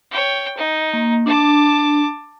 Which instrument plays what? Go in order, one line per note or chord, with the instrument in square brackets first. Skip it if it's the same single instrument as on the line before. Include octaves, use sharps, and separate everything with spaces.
[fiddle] C#5 G5
D#4
[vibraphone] A#3
[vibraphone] D4 [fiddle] A5 D6